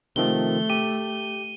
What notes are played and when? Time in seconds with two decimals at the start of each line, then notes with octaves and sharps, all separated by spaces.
0.16 C3 D#3 F3 A3 G7
0.70 G4 D#7